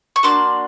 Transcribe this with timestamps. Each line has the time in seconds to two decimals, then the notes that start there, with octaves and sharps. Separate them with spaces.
0.16 C#6
0.23 A#3 D4 F#4 C6 D6